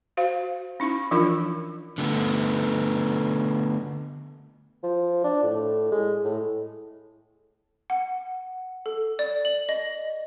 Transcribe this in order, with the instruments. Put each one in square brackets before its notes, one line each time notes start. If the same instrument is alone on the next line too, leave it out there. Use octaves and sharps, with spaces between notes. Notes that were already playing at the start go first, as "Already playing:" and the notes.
[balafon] F#4 C5 F5
C#4 D#4 E4 B5
E3 F3 D4 D#4 F4 A#4
[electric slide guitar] D3 A3 B3
[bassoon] F3
D4
A2
G#3
A2
[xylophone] F#5
A4
D5
F#7
D#5